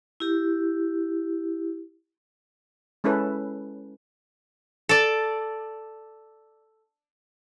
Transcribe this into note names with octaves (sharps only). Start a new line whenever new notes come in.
E4 G4
G#3 C#4 E4 A4 B4
A4 D5